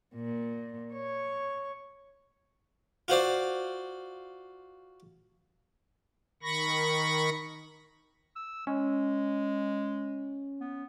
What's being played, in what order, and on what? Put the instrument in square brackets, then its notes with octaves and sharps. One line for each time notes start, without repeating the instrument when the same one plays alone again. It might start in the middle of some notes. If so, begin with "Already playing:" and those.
[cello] A#2
C#5
[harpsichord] F4 F#4 C5 D5
[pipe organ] D#3 B5 C#6 A#6
[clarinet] E6
[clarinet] G#3 [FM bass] C#4
[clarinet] B3